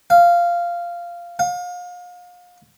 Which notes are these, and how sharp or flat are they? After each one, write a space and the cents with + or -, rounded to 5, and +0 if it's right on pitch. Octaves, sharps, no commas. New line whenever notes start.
F5 -10
F5 +35